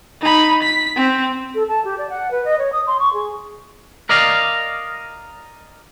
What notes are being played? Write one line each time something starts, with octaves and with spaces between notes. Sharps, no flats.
D#4 B5
B6
C4
A4
A5
G4
D5
F#5
B4
D#5
C#5
D#6
C6
C#6
G#4
A#4 D5 D#5 F5